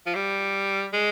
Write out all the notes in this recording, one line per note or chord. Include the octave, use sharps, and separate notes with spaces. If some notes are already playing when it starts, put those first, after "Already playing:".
F3
G3
G#3